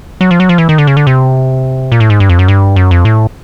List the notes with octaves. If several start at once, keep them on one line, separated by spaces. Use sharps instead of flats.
F#3
F3
F#3
F3
E3
D#3
D3
C#3
D3
C3
A#2
A2
G#2
G2
F2
F#2
G2
F#2
F2
A2